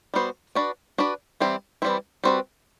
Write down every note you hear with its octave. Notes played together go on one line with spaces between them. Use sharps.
G3 B3 F#4 C5
D4 F#4 B4 D5
D4 F#4 B4 D5
E3 G3 C4 E4
E3 G3 C4 E4
G3 C4 F#4 B4